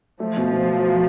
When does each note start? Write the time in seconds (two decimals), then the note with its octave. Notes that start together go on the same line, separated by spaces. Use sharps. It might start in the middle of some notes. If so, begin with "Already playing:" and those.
0.20 F3 A3
0.37 B2
0.53 B2
0.69 F#3
0.85 F#3